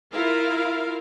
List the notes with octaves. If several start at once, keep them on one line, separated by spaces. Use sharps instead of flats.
E4 F4 A#4 F5